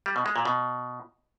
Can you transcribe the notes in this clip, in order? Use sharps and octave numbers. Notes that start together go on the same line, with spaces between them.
G3
B2
G#3
A#2
B2